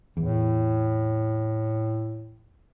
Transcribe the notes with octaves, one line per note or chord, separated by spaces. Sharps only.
E2 A2